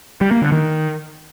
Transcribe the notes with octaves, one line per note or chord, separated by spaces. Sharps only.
G3
A#3
D3
D#3